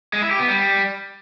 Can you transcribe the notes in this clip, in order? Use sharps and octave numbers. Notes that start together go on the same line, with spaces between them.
G#3
E4
G4
B3
G3